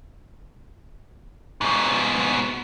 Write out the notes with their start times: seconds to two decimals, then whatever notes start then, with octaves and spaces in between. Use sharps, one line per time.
1.61 G#2 B2